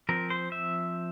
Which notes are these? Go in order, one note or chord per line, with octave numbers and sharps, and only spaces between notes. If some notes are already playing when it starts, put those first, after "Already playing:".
F3 C4 A#4
C5
E5